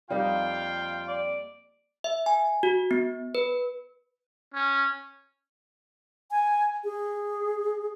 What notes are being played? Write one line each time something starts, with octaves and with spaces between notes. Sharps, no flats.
F2 G3 A#3 D#4 F4 F5 G5
D5
E5
G#5
F#4
B3
B4
C#4
G#5
G#4